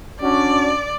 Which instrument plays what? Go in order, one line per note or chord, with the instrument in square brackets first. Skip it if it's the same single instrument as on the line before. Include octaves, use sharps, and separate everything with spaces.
[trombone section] C#4 D4 F#4 [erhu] D5